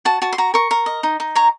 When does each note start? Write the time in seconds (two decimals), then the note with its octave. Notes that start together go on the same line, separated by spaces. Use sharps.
0.05 F#4 A5
0.22 F#4 A5
0.33 C6
0.38 F#4 A#5
0.54 A#4 C#6
0.71 A#4
0.86 D#5
1.03 D#4
1.20 D#4
1.35 C#5 A#5